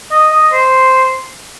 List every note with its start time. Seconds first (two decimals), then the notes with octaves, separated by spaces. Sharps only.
0.11 D#5
0.33 D#5
0.53 C5